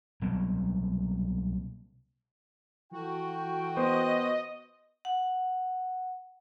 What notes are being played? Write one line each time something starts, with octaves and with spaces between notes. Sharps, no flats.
C2 B2 F#3 A#3
E3 F#4 A4 G5
B3 B4 C5 D#5
F#5